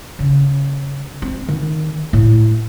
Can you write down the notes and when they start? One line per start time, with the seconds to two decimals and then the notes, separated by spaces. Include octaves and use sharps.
0.19 C#3
1.22 C4
1.49 D#3
2.13 A2